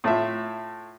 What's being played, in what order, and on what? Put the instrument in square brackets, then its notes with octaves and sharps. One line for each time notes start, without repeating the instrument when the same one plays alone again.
[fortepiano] A2 F4 E5